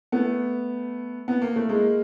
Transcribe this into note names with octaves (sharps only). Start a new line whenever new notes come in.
A3 B3
B3
A#3
A3
G#3 A#3